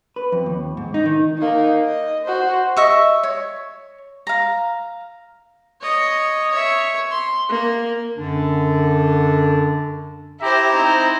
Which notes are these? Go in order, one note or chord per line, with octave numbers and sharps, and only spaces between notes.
B4
F2
D#2
G#2
D#4
D#3
A#3 D#4
D#5
F#4 C5
D#5 E5 C#6
C#5
F5 A#5
C#5 D#5
C#5 E5
C6
A#3
F#2 D3 D4
E4 G4 C5 E5 A#5
C4 D#4 A#5